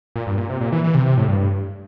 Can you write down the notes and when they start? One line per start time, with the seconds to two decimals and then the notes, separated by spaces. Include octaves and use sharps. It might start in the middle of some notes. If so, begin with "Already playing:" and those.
0.16 A#2
0.27 G2
0.38 A#2
0.49 C3
0.61 A#2
0.72 E3
0.84 E3
0.95 C3
1.06 C3
1.17 A2
1.28 G2
1.40 G2